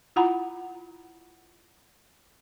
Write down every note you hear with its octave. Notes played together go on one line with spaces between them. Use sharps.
E4 F4 F#5 A#5 B5